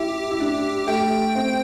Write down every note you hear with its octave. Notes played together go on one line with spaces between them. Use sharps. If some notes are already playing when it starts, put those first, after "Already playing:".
Already playing: E4 G4
E4
D4
A3 G5
C4